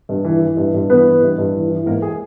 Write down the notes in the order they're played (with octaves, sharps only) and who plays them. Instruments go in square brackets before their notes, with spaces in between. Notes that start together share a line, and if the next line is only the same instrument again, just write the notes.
[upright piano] G2
E3
E3
G2
G2
E3 B3 B4
E3
G2
G2
E3
E3
G#2 A#3 A#4
G#4